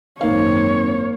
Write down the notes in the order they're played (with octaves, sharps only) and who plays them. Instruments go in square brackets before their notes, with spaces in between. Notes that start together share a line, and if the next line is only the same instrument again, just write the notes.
[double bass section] G#1 F#2 C4 [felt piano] A#3 F5 [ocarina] D#4 [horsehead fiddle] C#5